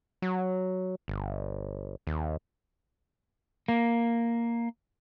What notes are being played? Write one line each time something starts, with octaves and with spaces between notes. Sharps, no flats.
F#3
G1
D#2
A#3